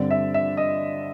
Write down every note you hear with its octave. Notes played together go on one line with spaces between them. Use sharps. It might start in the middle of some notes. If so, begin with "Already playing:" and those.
Already playing: G2 D3 G3 C4 D5
E5
E5
D#5